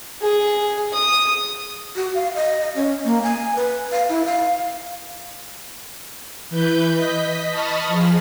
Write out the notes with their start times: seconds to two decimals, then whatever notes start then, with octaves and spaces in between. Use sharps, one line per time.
0.22 G#4
0.93 D#6
1.96 F#4
2.14 F5
2.35 D#5
2.61 D#5
2.75 C#4
3.05 A#3
3.22 G#5
3.55 B4
3.92 F5
4.09 E4
4.25 F5
6.50 E3 B4 G6
6.95 D#5 B6
7.50 D#5 A5 B5 C#6 D#6 F6
7.88 F3 G#4